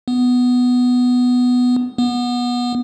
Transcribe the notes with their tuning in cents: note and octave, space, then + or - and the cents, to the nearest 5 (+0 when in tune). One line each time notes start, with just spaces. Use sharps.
B3 +5
B3 -20